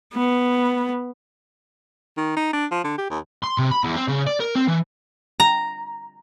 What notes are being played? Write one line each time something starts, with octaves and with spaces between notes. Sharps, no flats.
B3
D#3
D#4
D4
F3
D3
G4
D#2
C6
C3
B5
E2
C4
C#3
D5
A#4
C4
E3
A#5